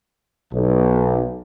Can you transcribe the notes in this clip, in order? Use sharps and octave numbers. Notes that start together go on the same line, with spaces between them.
B1